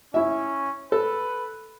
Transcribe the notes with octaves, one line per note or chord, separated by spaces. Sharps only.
C#4 E4 E5
A4 B4